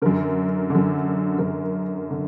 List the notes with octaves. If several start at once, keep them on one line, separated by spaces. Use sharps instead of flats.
F#2 D3 A#4
F#2 D3
F#2 D3 A#4
D3